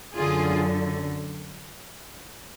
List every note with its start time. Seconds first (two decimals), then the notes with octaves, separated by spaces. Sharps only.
0.16 F#2 D3 F#3 F4 G#4